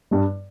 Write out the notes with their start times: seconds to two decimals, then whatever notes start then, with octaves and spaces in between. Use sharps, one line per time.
0.11 G2 G3